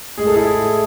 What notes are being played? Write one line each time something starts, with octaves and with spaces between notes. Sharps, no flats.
A2 G#3 G#4
A4
E4 G#4